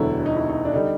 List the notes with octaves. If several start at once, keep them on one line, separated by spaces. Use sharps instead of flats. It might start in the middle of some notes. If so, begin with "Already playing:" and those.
Already playing: E1 D2 D3 F#3 E4
D#4
E4
D#4
D4
D3 G3 D#4